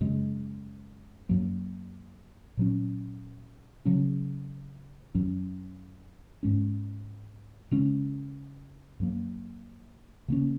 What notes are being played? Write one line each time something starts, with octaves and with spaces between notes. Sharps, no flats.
F#2 C#3 G#3
F#2 F#3 A#3
A#2 F#3 C#4
C#3 F#3 C#4
F#2 F#3 C#4
G#2 G#3 C#4
C#3 G#3 C#4
F#2 F#3 A#3
C#3 A#3 C#4